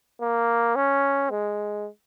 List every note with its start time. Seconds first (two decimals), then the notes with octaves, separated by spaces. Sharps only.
0.21 A#3
0.76 C#4
1.30 G#3